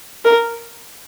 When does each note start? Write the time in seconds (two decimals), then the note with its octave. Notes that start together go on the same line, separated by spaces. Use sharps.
0.25 A#4